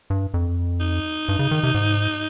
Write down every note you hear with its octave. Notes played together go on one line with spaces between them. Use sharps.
G2
F2
D#4
G2
C#3
D#3
C3
G#2